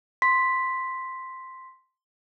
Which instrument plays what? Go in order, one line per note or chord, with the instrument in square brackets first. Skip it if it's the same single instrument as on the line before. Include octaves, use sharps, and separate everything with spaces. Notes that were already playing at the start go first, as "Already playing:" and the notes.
[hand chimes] C6 B6